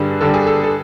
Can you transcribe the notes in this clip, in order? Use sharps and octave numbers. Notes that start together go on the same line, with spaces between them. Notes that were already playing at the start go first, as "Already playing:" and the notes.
Already playing: G2 D3 G3 G#4
G2 D3 G3 A4
G#4
A4
A4